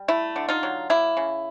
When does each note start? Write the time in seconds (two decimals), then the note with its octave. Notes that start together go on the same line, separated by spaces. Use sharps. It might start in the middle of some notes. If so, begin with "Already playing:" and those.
Already playing: G3
0.08 A3 E4
0.36 D3
0.48 D#4 F4
0.63 F#3
0.90 A#3 E4
1.17 C#3